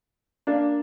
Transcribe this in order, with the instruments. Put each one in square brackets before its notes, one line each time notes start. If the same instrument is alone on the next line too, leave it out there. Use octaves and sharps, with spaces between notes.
[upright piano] A#3 D4